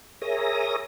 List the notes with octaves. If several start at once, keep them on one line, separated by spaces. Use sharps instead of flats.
G#4 A#4 C#5 E5 D#6 A#6